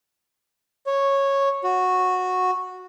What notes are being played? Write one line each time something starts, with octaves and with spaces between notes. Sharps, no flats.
C#5
F#4